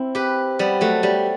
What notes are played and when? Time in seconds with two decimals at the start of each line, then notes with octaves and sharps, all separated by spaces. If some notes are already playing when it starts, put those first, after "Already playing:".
Already playing: C4 E4
0.15 G4 B4
0.59 G3 B3
0.81 F#3 A3
1.03 G3